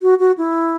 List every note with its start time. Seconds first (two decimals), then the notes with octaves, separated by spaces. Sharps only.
0.02 F#4
0.20 F#4
0.38 E4